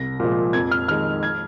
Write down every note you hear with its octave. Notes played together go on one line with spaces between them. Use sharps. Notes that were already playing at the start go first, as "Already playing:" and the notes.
Already playing: C2 A#6
A#2 F3 G#3
F2 G#6
F6
D#3 G#3 F6
G#6